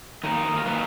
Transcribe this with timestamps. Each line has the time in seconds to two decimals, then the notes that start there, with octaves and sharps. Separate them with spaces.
0.23 D#3 F#3 A#3 D#4
0.57 A#4
0.65 D#3 F#3 A#3 B4